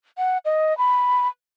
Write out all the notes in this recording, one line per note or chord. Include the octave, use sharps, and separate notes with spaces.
F#5
D#5
B5